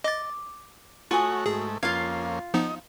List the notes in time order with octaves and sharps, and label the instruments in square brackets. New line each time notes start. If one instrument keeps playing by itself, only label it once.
[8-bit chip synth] D#5 A6 [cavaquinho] D6
[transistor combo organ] A3 C#5 F#5 [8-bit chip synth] F4 [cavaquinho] F#4 G#5 D#6
[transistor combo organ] G#2 A3 [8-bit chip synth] G#4
[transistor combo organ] F2 A#3 C#4 [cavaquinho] F4 F5 [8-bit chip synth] G#6
[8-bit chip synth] F3 B3 D#4 [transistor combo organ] D#5